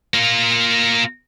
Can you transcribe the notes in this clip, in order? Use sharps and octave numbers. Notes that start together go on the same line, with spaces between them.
A#3 F4